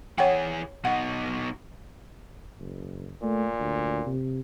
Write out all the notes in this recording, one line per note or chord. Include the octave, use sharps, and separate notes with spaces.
E3 G#4 C#5 F#5 G5
B2 D#4 F#5
F#1
A#2 A3
D2
C3